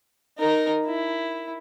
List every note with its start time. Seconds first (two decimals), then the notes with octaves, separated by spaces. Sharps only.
0.39 D#4 A#4
0.86 E4